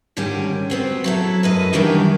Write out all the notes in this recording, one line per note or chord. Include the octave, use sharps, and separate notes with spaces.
G#2 D3 D#3 G3 C#4
B3 C4 F#4
F#3 E4 A4
F#2 B4 D#5
D#3 E3 F#3 G3 D4 D#4